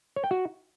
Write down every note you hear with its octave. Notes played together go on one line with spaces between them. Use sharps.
C#5
G5
F#4